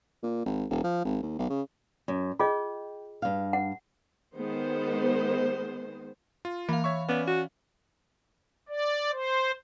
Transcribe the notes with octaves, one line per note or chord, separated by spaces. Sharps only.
A#2
G#1
E1
F3
G#1
D#2
B1
C#3
F#2
F4 G#4 D#5 G5
G2 F5
F#5
D#3 G#3 B3 C5
F4
E3 A#3 F5
C#5 E5 C#6
B3 C#4 D5
F#4
D5
C5